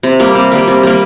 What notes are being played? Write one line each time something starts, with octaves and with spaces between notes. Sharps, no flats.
C3
G3 A#3
C3
G3 A#3
C3
G3 A#3